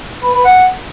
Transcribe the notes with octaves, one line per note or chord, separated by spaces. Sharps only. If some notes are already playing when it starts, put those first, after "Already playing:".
B4
B4
F#5